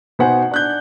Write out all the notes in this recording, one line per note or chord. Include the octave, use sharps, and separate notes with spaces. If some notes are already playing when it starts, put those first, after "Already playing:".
B2 B3 D#4 C5 F#5 G#5
D4 F#6 G6